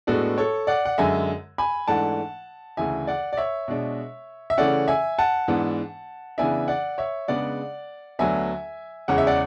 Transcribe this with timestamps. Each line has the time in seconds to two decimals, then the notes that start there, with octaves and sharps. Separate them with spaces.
0.07 A2 G#3 B3 D4 F#4 A4
0.38 A4 C#5
0.67 D5 F#5
0.85 F#5
0.98 F#2 D3 G#3 E5 G#5
1.58 G#5 B5
1.88 G#2 E3 A3 D4 F#5 A5
2.77 D2 C#3 E3 E5 G#5
3.07 D5 F#5
3.33 D5
3.37 C#5 E5
3.68 B2 G#3 D4
4.50 E5
4.58 C#3 E3 A3 C#4 D5 F#5
4.88 E5 G#5
5.19 F#5 A5
5.48 G#2 E3 B3 D4
6.38 C#3 E3 B3 D4 E5 G#5
6.68 D5 F#5
6.98 C#5 E5
7.28 C#3 G#3 B3 D4 D5 F#5
8.19 D2 D3 F#3 B3 D4 E5 G#5
9.08 E2 C#3 G#3 C#4 F#5
9.18 E5
9.27 D5 F#5